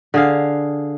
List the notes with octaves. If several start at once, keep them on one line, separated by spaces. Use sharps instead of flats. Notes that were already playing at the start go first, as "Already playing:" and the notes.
D3 G#4 F5